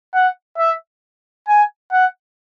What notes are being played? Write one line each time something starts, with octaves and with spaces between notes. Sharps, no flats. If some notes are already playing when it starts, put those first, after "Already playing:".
F#5
E5
G#5
F#5